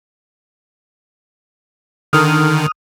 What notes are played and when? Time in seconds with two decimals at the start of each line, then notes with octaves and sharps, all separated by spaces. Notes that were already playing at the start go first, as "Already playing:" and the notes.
2.13 D3 D#3 D#6 F6